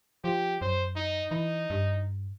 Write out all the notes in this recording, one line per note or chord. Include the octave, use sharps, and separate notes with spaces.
F3 G4
F#2 C5
D#4
E3 D#4
G2